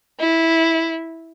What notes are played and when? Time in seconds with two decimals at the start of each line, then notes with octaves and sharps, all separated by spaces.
0.20 E4